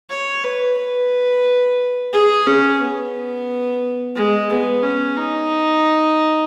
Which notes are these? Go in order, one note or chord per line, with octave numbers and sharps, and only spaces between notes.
C#5
B4
B4
G#4
C#4
B3
G#3
B3
C#4
D#4